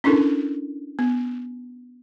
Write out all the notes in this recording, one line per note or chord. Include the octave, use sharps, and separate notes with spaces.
C#4 D4 E4 A4 A#4
B3